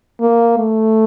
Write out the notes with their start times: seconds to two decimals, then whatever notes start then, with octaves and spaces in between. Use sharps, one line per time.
0.21 A#3
0.58 A3